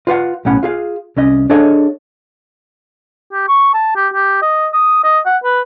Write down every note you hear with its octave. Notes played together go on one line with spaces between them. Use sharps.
F4 B4 F5 F#5
B1 A2 C#4 F#5 B5
F4 G#4 F5
C2 C#4 D#5
D4 G#4 A4 C#5 D#5 F5
G4
C#6
A5
G4
G4
D#5
D#6
D#5
F#5
B4